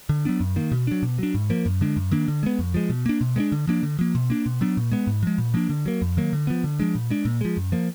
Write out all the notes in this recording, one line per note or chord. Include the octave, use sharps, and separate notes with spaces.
D3
F#3 B3 D4
F#2
D#3 A#3
B2
F#3 D4
B2
F#3 D4
G#2
F3 A#3
F#2
D3 G#3 D4
F#2
D#3 A#3 D4
D3
G#3 B3
F2
F3 G#3
B2
A#3 D4
B2
G#3 B3 D4
D3
F3 A#3 D4
D3
F3 A#3
B2
A#3 D4
B2
F#3 B3 D4
A#2
G#3 B3
G#2
F3 G#3
A#2
F3 A#3 D4
D3
F#3 A#3
F2
D#3 F#3 A#3
D3
F3 B3
D3
F3 G#3 D4
A#2
G#3 D4
A#2
F3 G#3
F#2
F3 A#3